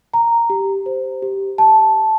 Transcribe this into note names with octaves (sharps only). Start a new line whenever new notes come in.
A#5
G4
C5
G4
A5